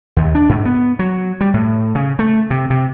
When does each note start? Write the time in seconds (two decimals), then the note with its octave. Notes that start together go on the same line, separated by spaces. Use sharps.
0.16 D#2
0.35 D4
0.49 G#2
0.65 B3
0.99 F#3
1.41 G3
1.54 A2
1.95 C#3
2.19 A3
2.50 C3
2.70 C3